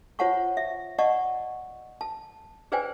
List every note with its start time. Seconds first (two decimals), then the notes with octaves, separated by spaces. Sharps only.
0.19 F4 C5 C#5 F#5 A5 C#6
0.57 E5
0.98 D5 D#5 F#5 A5 C#6
2.01 A5
2.72 G#4 B4 C5 D5 G5 G#5